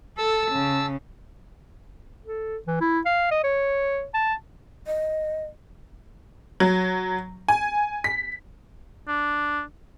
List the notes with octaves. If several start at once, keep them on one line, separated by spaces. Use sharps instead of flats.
A4 A5 E6
C#3
A4
E3
E4
F5
D#5
C#5
A5
D#5
F#3
G#5
B6
D4